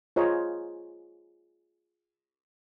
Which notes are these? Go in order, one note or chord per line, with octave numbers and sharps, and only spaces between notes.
F4 G#4 C5 C#5 D#5 A#5